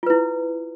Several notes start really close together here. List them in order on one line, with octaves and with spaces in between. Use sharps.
F4 B4 E4